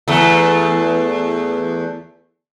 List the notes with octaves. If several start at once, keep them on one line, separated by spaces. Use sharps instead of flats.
E2 A3